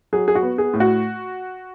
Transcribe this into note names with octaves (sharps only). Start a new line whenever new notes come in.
F#3 G#4
G#4
F#4
B3
G#4
A2
F#4